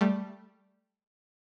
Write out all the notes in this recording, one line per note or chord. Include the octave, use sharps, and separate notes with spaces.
G3 A3